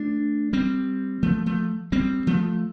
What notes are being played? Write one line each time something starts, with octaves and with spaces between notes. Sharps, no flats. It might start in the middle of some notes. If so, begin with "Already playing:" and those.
Already playing: A3 D4
G3 C4
F3 A3
F3 A3
G3 C4
F3 A3